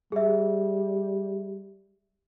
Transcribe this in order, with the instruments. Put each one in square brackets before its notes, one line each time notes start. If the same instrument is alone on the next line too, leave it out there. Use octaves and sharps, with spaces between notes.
[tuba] G3 [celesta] G#4 E5